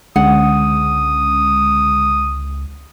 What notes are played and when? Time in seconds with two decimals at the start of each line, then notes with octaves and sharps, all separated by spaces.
0.16 C#2 D3 G#3 C#4 F#5 D#6